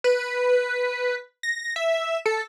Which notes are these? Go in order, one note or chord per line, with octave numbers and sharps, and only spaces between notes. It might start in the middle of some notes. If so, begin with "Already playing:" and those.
B4
A#6
E5
A4